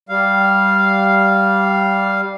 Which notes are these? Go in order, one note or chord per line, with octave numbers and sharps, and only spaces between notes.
G3 F5